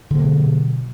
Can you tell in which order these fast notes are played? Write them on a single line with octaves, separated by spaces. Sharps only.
D3 A#3 B2 F#3